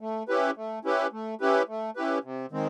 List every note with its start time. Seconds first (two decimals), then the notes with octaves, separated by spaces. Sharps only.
0.01 A3
0.28 C#4 E4 G4 B4
0.57 A3
0.85 C#4 E4 G4 B4
1.12 A3
1.41 C#4 E4 G4 B4
1.68 A3
1.96 C#4 E4 G4 B4
2.24 C3
2.52 D#3 G#3 C4